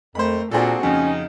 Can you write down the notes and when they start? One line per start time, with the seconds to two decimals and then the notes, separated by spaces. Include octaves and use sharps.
0.15 F2 A3 A#4 C5 B5
0.51 A#2 A#3 C4 D4 F#4 G#4 A4
0.83 F2 C#3 C#4 D#4